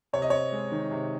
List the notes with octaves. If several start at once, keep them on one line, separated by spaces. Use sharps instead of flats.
C3 C#5
D#5
C4 C#5
G#3
D#3
C3